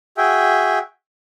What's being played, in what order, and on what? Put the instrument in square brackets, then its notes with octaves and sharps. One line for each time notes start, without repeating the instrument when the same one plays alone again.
[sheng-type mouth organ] F#4 G#4 E5 G5